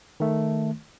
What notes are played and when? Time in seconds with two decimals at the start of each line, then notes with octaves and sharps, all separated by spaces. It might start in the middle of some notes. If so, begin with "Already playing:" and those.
0.20 D#3 A3